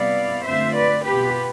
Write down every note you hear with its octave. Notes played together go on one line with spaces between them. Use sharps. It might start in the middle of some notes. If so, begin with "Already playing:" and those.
Already playing: C3 G3 B3 E4 D5 F5
D3 A3 C4 F4 C5 E5
B4 D5
B2 B3 F4 G4 B4